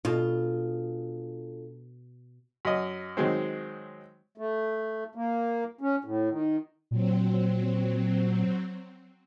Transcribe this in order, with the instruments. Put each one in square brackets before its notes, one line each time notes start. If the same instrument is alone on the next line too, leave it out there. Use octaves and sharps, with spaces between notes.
[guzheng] B2 [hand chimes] D4 A4 [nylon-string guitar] F4
[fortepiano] F#2 D#5
D#3 F#3 G#3 C4
[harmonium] A3
A#3
C#4
A2
D#3
[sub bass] A#2 [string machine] F#3 C4